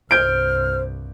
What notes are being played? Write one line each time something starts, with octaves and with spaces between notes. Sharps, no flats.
C2 G2 C5 F6 G6 D7